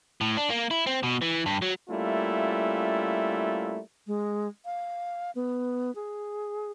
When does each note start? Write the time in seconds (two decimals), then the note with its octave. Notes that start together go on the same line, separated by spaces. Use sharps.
0.21 A2
0.37 D4
0.50 A#3
0.71 E4
0.87 C4
1.03 B2
1.22 E3
1.46 G2
1.62 F#3
1.89 G3 A3 A#3 C#4 E4 F4
4.07 G#3
4.65 F5
5.35 B3
5.95 G#4